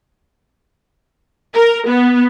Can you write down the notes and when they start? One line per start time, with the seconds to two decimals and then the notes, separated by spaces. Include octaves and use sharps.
1.55 A#4
1.88 B3